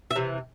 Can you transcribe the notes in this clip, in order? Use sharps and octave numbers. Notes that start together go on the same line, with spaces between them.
E5
C3 E3